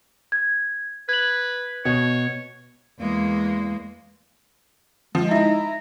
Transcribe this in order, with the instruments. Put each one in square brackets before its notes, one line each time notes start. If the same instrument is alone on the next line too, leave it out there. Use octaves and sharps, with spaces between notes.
[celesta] G#6
[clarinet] B4 [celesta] G#6 F#7
[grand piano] B2 [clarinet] C#5
[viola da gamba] E2 G#3 A#3
[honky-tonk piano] F3 [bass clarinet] G#3
[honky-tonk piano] D#4 E4 [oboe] A#5